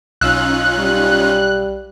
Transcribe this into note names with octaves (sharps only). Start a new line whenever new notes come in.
B1 C#4 D#4 F4 F5 E6 F#6
G3